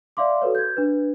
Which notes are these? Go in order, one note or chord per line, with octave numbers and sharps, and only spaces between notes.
D5 E5 F5 C6 D6
F#4 A4 B4 C#5
G6 G#6
D4 B4